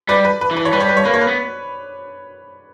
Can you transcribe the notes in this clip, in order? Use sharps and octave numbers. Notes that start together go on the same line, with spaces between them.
G3 B4 D5
B4
B4
E3
B4
C#5
G3 B4
C#5
B4
C#5
A#3 B4
C#5
B4
B3